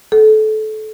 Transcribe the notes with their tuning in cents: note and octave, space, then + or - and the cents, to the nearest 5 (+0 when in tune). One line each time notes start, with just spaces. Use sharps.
A4 -25